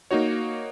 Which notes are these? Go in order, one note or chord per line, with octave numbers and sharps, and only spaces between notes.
A#3 D#4 F#4 C#5